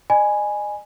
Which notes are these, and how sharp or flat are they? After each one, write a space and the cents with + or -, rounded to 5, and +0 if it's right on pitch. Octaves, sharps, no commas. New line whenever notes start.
D#5 -40 G#5 +0 B5 +0